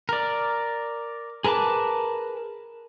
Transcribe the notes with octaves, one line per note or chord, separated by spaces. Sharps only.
A#4 D5
G#4 A#4 B4 A5 D6